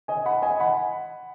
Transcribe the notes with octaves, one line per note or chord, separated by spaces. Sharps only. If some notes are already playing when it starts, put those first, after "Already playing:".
D#5 G#5
F#5 B5
D#5 G#5
F#5 B5